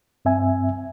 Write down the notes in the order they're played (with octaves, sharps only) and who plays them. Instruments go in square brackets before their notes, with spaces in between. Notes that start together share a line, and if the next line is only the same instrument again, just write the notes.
[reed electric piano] G2 C4 E5 G#5